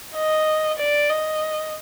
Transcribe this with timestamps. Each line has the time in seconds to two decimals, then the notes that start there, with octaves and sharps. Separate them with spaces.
0.16 D#5
0.79 D5
1.10 D#5